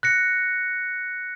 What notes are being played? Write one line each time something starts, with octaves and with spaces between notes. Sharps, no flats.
F#6 A#6 C#7